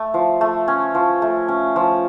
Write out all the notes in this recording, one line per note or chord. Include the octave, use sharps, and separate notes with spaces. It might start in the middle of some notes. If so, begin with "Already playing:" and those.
Already playing: A3
F3
A3
C#4
F3
A3
C#4
F3